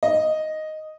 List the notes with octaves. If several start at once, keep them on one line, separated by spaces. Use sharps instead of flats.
D#5